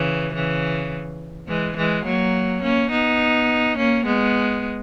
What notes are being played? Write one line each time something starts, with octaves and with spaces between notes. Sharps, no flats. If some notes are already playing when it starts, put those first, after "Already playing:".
Already playing: C#3 E3
C#3 E3
E3 G#3
E3 G#3
F#3 A#3
A#3 C#4
B3 D#4
A#3 C#4
G#3 B3